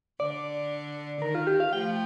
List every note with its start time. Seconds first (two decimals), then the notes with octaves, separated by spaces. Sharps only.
0.20 D3 D5
1.22 D#3 A#4
1.35 F4
1.47 G4
1.60 F5
1.72 F3 A3 G5